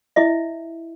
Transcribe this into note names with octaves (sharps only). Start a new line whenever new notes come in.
E4 D#5 E5